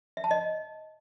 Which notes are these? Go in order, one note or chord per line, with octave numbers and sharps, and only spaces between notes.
E5
A5
D#5